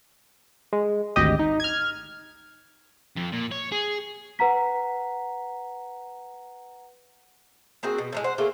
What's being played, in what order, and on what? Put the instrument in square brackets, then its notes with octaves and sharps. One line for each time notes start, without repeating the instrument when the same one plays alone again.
[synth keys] G#3
G#1 D2 G4 D#5
D#4
F6 G#6
[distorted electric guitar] F2
A#2
C#5
G#4
[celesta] B4 F#5 A#5 B6
[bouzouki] A#3 C4 F#4 G#4
B2
A2 F3 G#3
C5 F#5
A3 A#3 F4 G#4